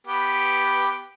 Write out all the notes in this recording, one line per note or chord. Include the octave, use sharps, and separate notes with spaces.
B3 G4 B4